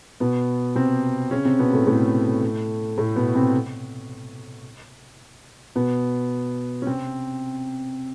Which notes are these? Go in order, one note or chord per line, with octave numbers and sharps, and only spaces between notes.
B2 B3
C3 C4
C#3 C#4
C3 C4
B2 B3
A2 A3
A2 A3
A2 A3
B2 B3
C3 C4
B2 B3
C#4
C3 C4